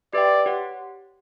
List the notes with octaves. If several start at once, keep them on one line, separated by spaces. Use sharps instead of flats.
G4 B4 D5 E5 G5
G4 C#5 F#5